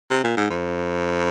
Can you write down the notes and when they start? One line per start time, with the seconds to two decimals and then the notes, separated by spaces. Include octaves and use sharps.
0.11 C3
0.24 A#2
0.37 G#2
0.50 F2